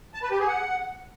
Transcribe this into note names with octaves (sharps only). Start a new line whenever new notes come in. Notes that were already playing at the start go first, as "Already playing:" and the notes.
A5
B4
G4
G#4
F#5